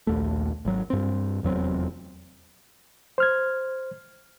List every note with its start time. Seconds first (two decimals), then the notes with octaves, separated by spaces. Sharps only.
0.07 A#1 D#2 A3
0.65 G#1 F#3
0.90 G2 C4
1.43 F1 E2 F#3 C4
3.18 C5 F6 G#6